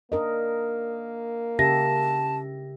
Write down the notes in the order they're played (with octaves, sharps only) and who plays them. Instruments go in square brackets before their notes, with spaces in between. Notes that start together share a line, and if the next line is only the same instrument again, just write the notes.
[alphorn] A#3 [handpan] D4 A#4 D#5
[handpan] C#3 G4 E5 [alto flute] A5 [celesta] A#6